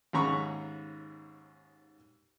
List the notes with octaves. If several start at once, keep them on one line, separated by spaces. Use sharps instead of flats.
D#2 G#2 C#3 A#5 B5 C#6